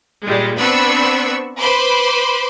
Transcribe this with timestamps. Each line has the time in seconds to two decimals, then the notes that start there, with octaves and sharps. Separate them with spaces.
0.24 A#2 G3 G#3
0.59 B3 C4 D4 B5 C#6 E6
1.59 B4 C5 B5 C6 D6